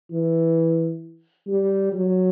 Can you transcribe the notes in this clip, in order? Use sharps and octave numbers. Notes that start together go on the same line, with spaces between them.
E3
G3
F#3